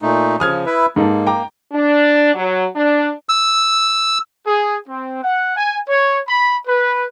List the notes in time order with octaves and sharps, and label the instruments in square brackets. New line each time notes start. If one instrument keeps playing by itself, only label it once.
[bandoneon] A#2 A3 D#4
[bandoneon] C#3 F3 [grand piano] D#6 F6 G#6
[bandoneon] E4 B4 E5
[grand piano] G#2 D#4 A4 [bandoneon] A#3
[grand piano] G5 A#5 D6
[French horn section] D4
F#3
D4
[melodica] E6
[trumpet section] G#4
C4
F#5
G#5
C#5
B5
B4